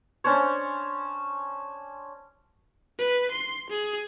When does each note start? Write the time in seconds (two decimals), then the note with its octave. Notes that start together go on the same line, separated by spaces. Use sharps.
0.24 C#4 D4 C5 C#5
2.99 B4
3.31 C6
3.70 G#4